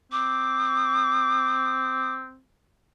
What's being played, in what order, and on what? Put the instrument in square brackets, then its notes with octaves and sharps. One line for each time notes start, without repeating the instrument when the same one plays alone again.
[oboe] C4 [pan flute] D6